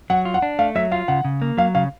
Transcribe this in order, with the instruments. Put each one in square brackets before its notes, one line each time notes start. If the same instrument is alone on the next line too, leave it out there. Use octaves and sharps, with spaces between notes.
[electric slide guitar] F#3 [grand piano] F#5
[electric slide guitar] F4
[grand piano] F#5
[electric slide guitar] D4
[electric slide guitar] A3 [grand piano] F5
[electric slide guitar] F#3 [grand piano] E5
[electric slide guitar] F4 [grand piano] F5
[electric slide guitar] C#3 [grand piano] F#5
[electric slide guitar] C#3
A#3
[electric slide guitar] F#3 [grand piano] F5
[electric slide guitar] C#3 [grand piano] F5